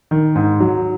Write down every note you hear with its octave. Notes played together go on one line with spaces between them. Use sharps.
D#3
G#2
F#3